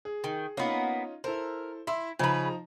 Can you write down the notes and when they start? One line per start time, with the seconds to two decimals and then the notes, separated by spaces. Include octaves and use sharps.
0.05 G#4
0.24 D#3
0.57 A#3 B3 C#4 D#4 F4
1.24 E4 A4 A#4 C5
1.87 E4 E5 C6
2.19 C#3 F3 D#4 B4 A#5